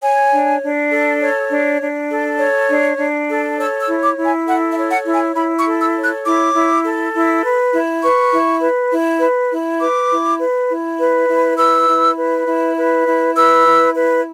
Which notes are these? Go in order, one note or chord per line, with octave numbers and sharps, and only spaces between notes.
C#5 G#5
D4
D4
A4
C#5
D4
D4
A4
C#5
D4
D4
A4
C#5 E6
E6
E4
D6
E4
G#5
A4 F#5
E5
C#5
F#5
E4
G#5
E4 B5
C#6
A4
E6
C#5
F#6
E4 D6
E4
A4
E4
B4
E4
B4 C#6
E4
B4
E4
B4
E4
B4 D6
E4
B4
E4
B4
E4
B4 E6
E4
B4
E4
B4
E4
B4 E6
E4
B4